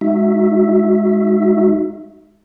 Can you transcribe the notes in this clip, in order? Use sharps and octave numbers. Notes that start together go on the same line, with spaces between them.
G#3 D#4 F#4 E5